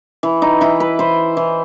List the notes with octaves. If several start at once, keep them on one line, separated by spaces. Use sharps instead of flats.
E3
D#4
E3 E4
B4
E3 C5
E3